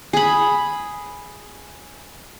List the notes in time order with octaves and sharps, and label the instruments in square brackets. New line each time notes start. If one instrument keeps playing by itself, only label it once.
[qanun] G#4 B5